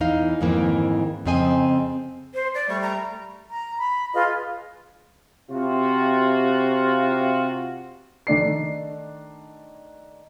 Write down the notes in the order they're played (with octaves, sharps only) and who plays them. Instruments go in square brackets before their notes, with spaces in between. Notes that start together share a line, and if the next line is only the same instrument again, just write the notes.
[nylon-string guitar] E2 E3 D#4 F5
F2 G#2 D#3 E3 A#3
F2 C#3 C4 D#5 G#5
[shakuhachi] C5
D5
[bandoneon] G3 A3 [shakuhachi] C#6
[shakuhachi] A#5
[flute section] A#5
B5
F4 G#4 B4 D#5
[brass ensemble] C3 F4 F#4
[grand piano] D#3 A3 D4 C7